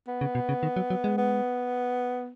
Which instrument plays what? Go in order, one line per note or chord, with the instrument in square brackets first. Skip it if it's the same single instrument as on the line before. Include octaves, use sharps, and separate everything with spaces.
[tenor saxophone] B3
[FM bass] C#3
B2
C#3
D#3
F#3
F#3
G#3
[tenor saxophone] B3